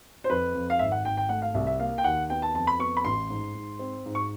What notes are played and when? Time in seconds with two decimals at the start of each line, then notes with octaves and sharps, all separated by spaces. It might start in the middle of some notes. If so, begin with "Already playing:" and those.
0.24 C5
0.30 F2 B4
0.54 F2
0.70 F5
0.79 G#1 E5
0.92 F#5
1.05 G#1 G5
1.17 G5
1.29 A3 F#5
1.42 F5
1.54 C2 E5
1.67 E5
1.79 A#3 F5
1.98 G5
2.04 D#2 F#5
2.30 B3 G5
2.42 A5
2.54 F2 A5
2.67 B5
2.79 B3 C#6
2.97 B5
3.05 A1 C6
3.30 G#2
3.55 G#2
3.79 C4
4.06 G#2
4.15 C#6